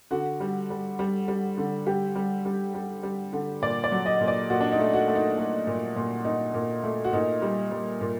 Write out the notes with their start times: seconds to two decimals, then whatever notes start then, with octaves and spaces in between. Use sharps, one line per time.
0.11 D3 F#4
0.40 G3
0.70 G3
0.99 G3
1.28 G3
1.58 D3
1.86 G3 G4
2.15 G3
2.45 G3
2.74 G3
3.03 G3
3.33 D3
3.62 A#2 D5
3.84 D5
3.92 F#3
4.06 D#5
4.21 A#2
4.28 D5
4.50 A#2 F#4
4.61 D4
4.72 D#4
4.79 A3
4.94 F#4
5.08 A3
5.15 D#4
5.37 A3
5.67 A#2
5.96 A#2
6.25 A#2 D#4
6.54 A#2
6.84 A3
7.04 F#4
7.13 A#2 D#4
7.42 G3
7.71 G3
8.01 A#2